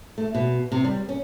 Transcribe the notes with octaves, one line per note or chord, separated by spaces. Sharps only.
A3
B2
C3
G3
C#4